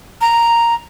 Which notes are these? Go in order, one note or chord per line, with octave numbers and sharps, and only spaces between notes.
A#5